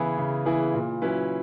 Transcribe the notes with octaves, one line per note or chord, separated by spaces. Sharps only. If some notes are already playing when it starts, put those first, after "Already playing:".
Already playing: C#3 E3 B3 E4 G#4
C#3
E3 B3 E4 G#4
A#2
F#3 C#4 E4 B4